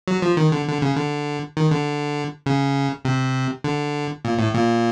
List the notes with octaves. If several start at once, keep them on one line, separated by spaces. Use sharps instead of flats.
F#3
F3
D#3
D3
D3
C#3
D3
D#3
D3
C#3
C3
D3
A#2
A2
A#2